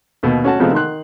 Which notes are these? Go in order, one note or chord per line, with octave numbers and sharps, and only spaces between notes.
D#2 B2
C#4 F#4 A5
C3 F3 G#3 A3 B3
D#3 C6 F#6